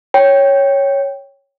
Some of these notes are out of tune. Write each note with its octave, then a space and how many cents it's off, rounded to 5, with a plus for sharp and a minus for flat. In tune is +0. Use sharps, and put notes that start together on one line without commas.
C#5 +0 G5 +0